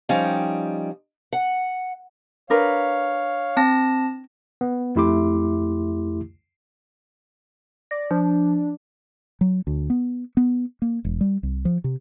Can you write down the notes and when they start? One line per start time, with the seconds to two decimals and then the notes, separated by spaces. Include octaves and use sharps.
0.09 F3 G3 C#4 D#4 G5
1.33 F#5
2.50 D4 A#4 B4 C#5 F5
3.57 C4 A5 A#6
4.61 B3
4.96 F2 A3 E4 G4 C6 D6
7.91 D5 A#6
8.11 F3 D4
9.41 F#3
9.67 D2
9.90 B3
10.37 B3
10.82 A#3
11.05 E1
11.21 G3
11.43 C2
11.65 F3
11.84 C3